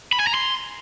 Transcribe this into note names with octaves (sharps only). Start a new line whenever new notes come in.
B5
G#5
A#5
C6